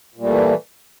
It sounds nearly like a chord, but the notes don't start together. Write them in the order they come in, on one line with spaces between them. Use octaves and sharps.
A#2 G3 A3 E3